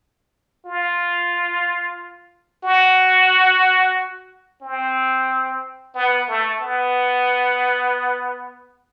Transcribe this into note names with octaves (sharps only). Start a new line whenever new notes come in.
F4
F#4
C4
B3
A3
B3